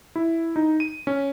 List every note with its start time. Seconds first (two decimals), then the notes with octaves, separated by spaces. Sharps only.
0.16 E4
0.56 D#4
0.80 D#7
1.07 C#4